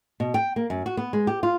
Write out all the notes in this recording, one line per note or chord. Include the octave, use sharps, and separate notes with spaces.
B2
G5
A#3
F#2
F#4
B3
G#3
G4
F4